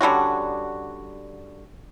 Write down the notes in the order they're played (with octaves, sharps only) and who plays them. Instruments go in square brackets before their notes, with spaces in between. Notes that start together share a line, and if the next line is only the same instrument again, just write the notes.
[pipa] D3 G3 C#4 F#4